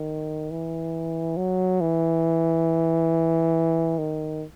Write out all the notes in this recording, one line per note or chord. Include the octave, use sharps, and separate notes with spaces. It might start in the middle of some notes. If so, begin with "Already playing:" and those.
Already playing: D#3
E3
F#3
E3
D#3